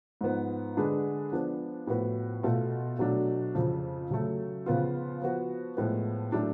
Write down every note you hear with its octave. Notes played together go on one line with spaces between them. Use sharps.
G#2 F3 B3
D3 G#3 D4 G#4 B4
F3 B3 D4
A2 F3 B3 F#4 B4
B2 A3 F4
B2 F#3 A3 D4 F#4
F2 C#3 F3
C#3 F#3 A3
C#3 F3 B3 F4
F3 B3 F#4
A2 F3 G#3 B3
A2 F#3 A3 D4